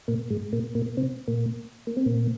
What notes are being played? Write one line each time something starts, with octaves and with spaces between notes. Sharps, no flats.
A#2 A#3
G#2 G#3
A#2 A#3
A#2 A#3
C3 C4
A#2 A#3
A#3
C4
A#2 A#3